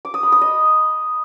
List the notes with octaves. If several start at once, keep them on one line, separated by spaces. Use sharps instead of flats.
D6
D#6
B5
D#6
D#5